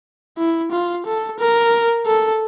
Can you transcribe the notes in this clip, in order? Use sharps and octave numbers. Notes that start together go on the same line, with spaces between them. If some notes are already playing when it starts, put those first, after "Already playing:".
E4
F4
A4
A#4
A4